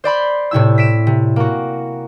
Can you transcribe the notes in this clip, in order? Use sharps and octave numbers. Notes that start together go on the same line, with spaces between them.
C5 D5 B5 C6
A2 C3 E4 E6
B6 D7 E7
C3
A#3 F#4